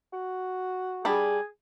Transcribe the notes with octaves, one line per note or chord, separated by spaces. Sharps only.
F#4
G3 D4 G#4 B5